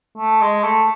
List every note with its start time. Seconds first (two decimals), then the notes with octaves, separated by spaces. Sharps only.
0.18 A3
0.41 G#3
0.63 A3